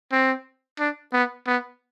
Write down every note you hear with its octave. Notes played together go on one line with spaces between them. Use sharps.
C4
D4
B3
B3